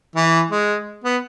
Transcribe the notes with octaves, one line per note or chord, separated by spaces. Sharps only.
E3
G#3
B3